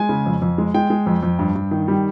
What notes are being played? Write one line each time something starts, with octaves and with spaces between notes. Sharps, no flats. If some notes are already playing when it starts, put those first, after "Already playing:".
Already playing: G#3 G#5
C#3
F2
F2
G#3
G#3 G5
G#3
F2
F2
G2
G2
D#3
G3